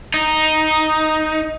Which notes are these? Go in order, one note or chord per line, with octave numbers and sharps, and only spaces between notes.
D#4